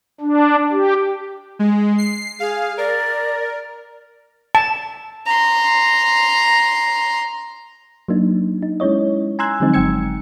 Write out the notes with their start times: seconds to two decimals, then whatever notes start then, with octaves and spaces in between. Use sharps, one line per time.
0.20 D4
0.72 G4
1.59 G#3
1.98 C7
2.40 G#4 F5
2.77 A#4 D5
4.55 A5
5.27 A#5 C6
8.08 F#3 A#3 D4 D#4
8.63 D#4
8.80 G#3 C#4 E4 C#5 D#5
9.39 G#5 A#5 C6 E6 F#6 G#6
9.60 D3 F3 F#3 G#3 C4 D#4
9.74 G1 G5 E6 G#6 C#7